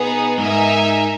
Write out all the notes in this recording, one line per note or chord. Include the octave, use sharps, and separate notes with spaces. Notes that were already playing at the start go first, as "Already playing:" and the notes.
Already playing: B2 B3 D#4 G#4 B4
G#2 D#4 A#4 E5 G#5